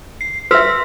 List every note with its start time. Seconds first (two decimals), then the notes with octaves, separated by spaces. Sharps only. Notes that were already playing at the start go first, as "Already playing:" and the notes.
0.21 C7
0.51 B4 E5 C6 E6 B6